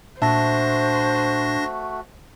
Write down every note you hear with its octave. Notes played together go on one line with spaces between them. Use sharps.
A#2 A3 D4 F#4 C5 E5 A5 A#6